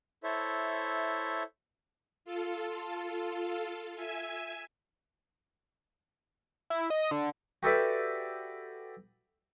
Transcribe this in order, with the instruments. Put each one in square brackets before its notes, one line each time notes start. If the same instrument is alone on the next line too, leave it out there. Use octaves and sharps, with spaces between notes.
[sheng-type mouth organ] E4 A4 C5 C#5 E5
[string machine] F4 A4
E5 G#5
[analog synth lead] E4
D#5
D3
[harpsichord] F#4 G4 A4 B4 D5 E5